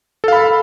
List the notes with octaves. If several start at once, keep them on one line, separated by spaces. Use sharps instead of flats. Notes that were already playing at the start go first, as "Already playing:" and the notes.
A4 F5 B5